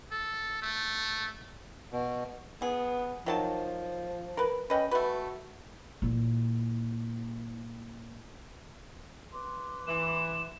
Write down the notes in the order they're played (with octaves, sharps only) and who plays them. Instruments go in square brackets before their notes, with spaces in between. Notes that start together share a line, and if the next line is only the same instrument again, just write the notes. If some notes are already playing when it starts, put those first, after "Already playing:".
[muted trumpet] A4
A3
[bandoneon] B2
[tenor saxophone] B3 [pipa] G#4
[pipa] D#3 F#3 A5 [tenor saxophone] F3
[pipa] A#4 B4
[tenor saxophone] C#4 [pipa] B4 D#5 G5
[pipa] A3 B4 [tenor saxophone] F#4
[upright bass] A#2 E3
[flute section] B4 C6 D6
[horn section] E3 [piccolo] E7